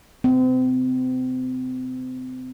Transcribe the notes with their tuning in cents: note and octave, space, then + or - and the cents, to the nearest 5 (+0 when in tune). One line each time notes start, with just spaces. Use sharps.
C4 -35